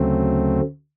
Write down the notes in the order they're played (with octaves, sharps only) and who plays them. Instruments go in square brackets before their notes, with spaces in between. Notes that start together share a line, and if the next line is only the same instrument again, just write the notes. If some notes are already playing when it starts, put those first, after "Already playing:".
Already playing: [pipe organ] D2 C#3 F#3 A3 C4